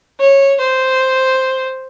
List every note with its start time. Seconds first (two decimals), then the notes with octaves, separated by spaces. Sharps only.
0.20 C#5
0.60 C5